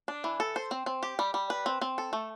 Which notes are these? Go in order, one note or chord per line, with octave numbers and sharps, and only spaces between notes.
D4
E3
A4
C5
C4
C4
G4
G3
G3
B4
C4
C4
A4
A3